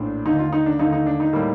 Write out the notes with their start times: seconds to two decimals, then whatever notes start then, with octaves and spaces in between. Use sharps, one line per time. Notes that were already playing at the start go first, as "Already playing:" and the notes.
Already playing: A#1 A2 D4
0.26 D#2 D3 A3 D#4
0.39 F4
0.53 D#4
0.66 D4
0.79 D#2 D3 A3 D#4
0.93 D#4
1.06 D4
1.20 D#4
1.33 A2 G3 A#3